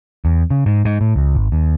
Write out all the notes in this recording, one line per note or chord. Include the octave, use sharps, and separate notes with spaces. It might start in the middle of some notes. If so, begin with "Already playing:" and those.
E2
C#3
G#2
G#2
A2
C#2
G#1
D#2